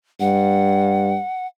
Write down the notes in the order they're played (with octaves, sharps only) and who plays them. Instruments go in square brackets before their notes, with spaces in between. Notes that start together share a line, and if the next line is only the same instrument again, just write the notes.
[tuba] G2 [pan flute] F#5